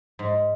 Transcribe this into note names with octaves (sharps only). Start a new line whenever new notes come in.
G#2